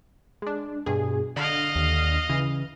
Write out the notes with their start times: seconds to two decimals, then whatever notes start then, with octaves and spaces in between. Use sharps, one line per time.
0.42 G#3 D4
0.86 G2 B2 G#4
1.36 D3 D#5 F5
1.76 D#2
2.30 C#3 E3